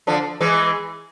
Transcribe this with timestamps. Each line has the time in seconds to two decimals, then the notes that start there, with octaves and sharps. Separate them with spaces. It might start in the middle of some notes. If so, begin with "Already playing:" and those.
0.07 D3 F3
0.41 E3 G#3